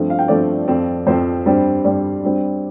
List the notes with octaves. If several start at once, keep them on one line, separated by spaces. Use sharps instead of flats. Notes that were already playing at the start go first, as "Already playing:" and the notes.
Already playing: G2 F3 A3 C4
F5
G5
G2 F3 A3 C4 D5
F2 F3 C4
F2 F3 C4 C5
G2 G3 C4
G2 G3 C4 D5
G2 G3 C4